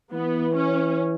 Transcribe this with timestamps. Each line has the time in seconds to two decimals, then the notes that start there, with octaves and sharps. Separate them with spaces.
0.12 E3 B3
0.56 C#4